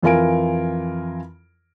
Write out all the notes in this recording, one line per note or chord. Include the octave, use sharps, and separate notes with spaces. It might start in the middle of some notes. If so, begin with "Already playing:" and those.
F2 E3 F4 A#4 G#5 D7